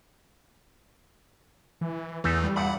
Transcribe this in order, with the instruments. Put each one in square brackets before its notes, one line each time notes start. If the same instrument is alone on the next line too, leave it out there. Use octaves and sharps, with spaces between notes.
[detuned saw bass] E3
[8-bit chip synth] E2 E3 [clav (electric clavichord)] A3 D#4 E5
[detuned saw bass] G3
[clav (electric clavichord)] E2 G2 A#2 [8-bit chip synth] F#5 B5